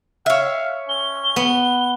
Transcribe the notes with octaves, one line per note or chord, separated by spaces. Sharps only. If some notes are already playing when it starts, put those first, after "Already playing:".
C#5 E5 F5
C#4 G7
B3